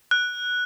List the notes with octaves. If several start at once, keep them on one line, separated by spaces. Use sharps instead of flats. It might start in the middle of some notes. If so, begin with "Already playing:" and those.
F#6